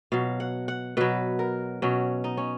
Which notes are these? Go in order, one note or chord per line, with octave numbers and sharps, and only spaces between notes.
B2 F#3 F5
F#5
F#5
B2 F#3 B4
A#4
B2 F#3 C#4
D#4
C#4